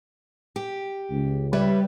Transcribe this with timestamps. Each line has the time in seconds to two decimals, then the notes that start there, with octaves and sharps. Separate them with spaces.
0.56 G4
1.10 C#2
1.53 G3 B4 C#5 E5